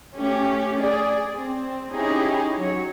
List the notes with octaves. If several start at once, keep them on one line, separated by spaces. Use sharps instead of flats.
A3 C#4 G4
G#4 D5
C4
C#4 D#4 E4 G4 G#4
F#3 C#5